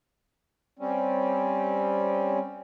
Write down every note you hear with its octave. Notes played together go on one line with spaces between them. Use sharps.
G3 C4 C#4